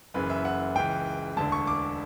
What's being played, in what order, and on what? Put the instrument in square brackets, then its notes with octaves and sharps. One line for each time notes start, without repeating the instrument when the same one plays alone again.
[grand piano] F#1 F#2 C#3 E3 B4
E5
F#5
C#2 C#3 E3 G5
E1 D2 D3 A5
C#6
D6